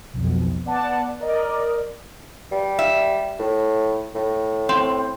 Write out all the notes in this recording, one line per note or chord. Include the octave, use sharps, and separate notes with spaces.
B1 F2
B3 D5 F#5 A5
A#4 D5 D#5
G3
E5
A2
A2
C4